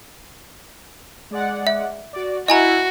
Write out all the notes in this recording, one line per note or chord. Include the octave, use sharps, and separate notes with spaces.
G#3 D5 F#5
E5
F#4 D5
E4 F#4 D#5 G#5 A#5